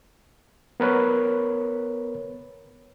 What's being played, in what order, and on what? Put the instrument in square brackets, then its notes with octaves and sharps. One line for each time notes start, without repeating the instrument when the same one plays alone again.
[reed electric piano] B3 A#4 B4 C#5